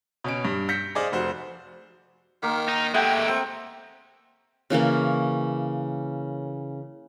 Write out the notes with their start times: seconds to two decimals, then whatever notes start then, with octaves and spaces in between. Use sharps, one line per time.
0.24 B2 C#4 D7
0.45 G2
0.69 G6 A#6 B6 C#7
0.95 G#4 C5 D5 D#5 F5
1.12 F1 F#4 C5
2.43 D#3 A#3
2.68 D#4
2.94 G#3 A3 G4 E5 F#5 G5
3.28 C4
4.70 C#3 E3 A#3 C#4